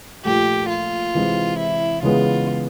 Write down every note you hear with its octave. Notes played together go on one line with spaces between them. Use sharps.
A#2 F3 A3 G4
F4
C3 E3 G#3 C4
E4
C#3 E3 G#3 B3 F4